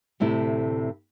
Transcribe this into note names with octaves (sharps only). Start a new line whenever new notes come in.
D2 A2 C3 E4